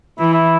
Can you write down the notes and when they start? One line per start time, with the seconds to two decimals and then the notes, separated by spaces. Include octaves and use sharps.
0.19 E3 E4
0.33 E4